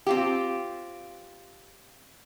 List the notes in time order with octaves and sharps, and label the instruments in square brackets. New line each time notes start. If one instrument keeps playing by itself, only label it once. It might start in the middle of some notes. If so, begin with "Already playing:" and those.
[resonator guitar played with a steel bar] C4 F4 G4